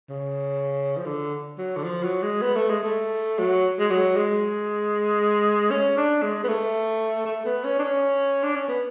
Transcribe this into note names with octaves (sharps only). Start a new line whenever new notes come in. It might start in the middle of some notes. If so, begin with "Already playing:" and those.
C#3
F3
D3
F#3
D3
F3
F#3
G#3
B3
A3
G#3
A3
F#3
G#3
F#3
G#3
C#4
D4
G#3
B3
A3
A3
B3
C#4
D4
C#4
D4
C#4
B3